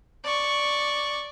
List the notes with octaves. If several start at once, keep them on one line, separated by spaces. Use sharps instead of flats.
D5 C#6